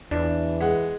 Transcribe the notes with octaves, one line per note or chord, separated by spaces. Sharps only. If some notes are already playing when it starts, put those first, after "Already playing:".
E2 E3 D4
G#3 F#5